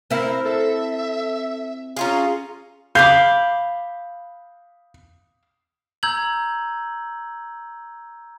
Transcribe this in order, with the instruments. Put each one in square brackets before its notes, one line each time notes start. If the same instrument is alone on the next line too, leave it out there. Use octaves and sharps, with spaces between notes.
[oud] C4 E4 [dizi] A#4
[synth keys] A4 [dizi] E5
[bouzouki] C#4 F4 G#4 [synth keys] F5 A#5
[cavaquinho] F5 B5 D6 [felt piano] G6
[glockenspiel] A#5 E6 G6 G#6 F#7